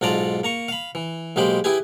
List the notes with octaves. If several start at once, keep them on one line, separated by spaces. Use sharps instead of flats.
B1 G#2 D4 F4 D5 A#5
A#3 A#5 C#6
F5 B5
E3
B1 G#3 A#3 G4 C5 B5
E4 G4 G#4 B4 G#5